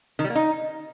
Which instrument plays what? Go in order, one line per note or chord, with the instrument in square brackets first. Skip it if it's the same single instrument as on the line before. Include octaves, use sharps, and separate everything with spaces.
[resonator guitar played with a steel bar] D#3
G3
A#3
D#4